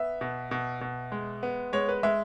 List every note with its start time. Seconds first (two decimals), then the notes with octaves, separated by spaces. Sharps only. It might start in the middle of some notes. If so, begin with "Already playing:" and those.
Already playing: B3 E5
0.21 B2
0.51 B2
0.81 B2
1.12 G#3
1.43 B3
1.73 G#3 C#5
1.89 B4
2.03 G#3 E5